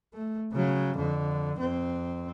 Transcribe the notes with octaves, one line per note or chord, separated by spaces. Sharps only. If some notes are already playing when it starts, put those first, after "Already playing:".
A3
C#3 F#3
F2 D3
F2 C4